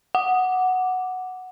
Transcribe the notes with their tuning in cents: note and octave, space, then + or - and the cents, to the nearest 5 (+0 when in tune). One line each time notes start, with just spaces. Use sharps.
F#5 +0 D6 +0